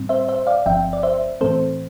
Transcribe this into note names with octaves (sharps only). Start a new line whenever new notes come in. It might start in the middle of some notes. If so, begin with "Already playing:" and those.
Already playing: A2 G3 C4
C5 E5
C5 E5
D5 F5
G1 G2 F3 C4 E5 G5
D5
C5 E5
A2 E3 A3 C4 A4 C5